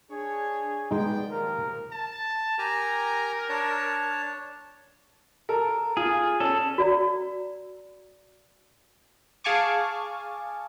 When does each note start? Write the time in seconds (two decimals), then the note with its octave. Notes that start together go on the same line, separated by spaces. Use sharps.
0.11 D4 G#4 C#5
0.91 G#3 B3 D#4 D5 G5
1.29 D#2 F3 A#4
1.92 A5
2.58 G4 A#4 G#5 A#5
3.49 D4 C#5 A5
5.49 A4 A#4
5.97 F4 G#4
6.40 C#4 A4
6.78 F#4 D5 A#5
9.44 G#4 F5 G#5 A5 C#6 D6